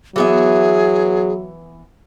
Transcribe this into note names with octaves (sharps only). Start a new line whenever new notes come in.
E3 F#3 B3 G#4 E5